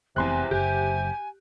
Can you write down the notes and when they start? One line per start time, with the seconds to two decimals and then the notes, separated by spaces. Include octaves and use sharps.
0.16 F1 E2 A2 C3 C4 G#5 C6 F#6
0.51 F#1 G4 G#5